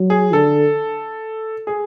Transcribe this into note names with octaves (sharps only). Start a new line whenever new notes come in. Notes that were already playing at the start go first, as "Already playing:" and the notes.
Already playing: F#3
G#4
D3 A4
G#4